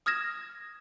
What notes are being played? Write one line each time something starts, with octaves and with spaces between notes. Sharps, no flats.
D#6 F6 G#6 A#6 E7